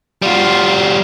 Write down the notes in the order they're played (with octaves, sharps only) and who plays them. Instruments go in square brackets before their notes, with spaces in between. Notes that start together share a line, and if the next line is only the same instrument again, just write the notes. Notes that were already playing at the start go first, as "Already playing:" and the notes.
[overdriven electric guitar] G3 F#4 [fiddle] F4